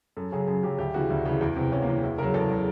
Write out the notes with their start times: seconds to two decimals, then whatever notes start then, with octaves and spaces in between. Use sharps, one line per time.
0.17 F#2 A4
0.32 C#3 F#3 G#4
0.47 F#2 G#4
0.63 C#3 F#3 G4
0.79 D2 G4
0.94 C#3 E3 F#4
1.10 D2
1.25 C#3 E3
1.41 E2
1.56 C3 E3
1.72 E2 C#4
1.82 A#3
1.87 C3 E3
2.03 E2 E4
2.18 C#3 F#3 A#4
2.34 E2 A4
2.50 C#3 F#3